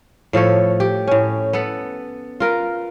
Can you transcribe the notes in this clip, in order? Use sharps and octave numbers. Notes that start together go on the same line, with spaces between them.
A2 F3 A4 C#5
G4
A2 C#4
B3 A4 B4
F4 A#4 B4